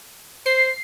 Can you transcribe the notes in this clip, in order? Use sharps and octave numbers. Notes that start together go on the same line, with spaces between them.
C5 C7